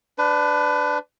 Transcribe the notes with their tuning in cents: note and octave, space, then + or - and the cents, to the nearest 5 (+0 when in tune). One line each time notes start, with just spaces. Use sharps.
D4 +0 B4 +25